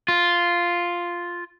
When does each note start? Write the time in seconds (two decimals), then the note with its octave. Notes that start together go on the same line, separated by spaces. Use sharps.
0.08 F4